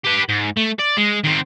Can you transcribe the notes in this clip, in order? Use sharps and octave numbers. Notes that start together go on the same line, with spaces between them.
G4 B4
G#2
A3
D5
G#3
D#3 C4